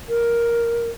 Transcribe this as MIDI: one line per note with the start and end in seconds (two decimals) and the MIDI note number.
0.09 0.90 70